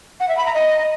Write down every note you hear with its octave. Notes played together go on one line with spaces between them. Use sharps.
F#5
E5
B5
A#5
D#5